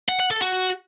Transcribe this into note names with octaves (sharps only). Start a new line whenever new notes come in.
F#5
F#5
A4
F#4